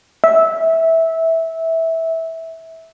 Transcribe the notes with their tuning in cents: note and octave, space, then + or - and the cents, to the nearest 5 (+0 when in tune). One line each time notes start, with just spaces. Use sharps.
E5 -15